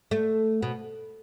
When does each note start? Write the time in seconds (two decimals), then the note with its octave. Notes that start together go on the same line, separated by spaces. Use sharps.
0.11 A3
0.63 B2